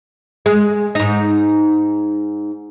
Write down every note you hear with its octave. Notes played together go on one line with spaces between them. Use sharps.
G#3
G#2 D#4